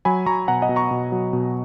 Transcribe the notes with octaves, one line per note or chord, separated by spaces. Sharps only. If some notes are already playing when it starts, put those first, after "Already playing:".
F#3 G#5 B5
F#3 A#5 C#6
B2 F#5 A#5
D#5 F#5
B2
A#5 C#6
B2
F#3
B2